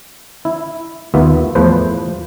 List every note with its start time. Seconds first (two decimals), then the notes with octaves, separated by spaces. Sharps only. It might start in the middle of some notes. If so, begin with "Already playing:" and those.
0.45 E4
1.14 D#2 B3 F4 E5
1.55 E2 A2 F3 B4 C5